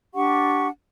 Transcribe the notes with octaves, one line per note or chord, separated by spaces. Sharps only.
D4 G4 F#5 C#6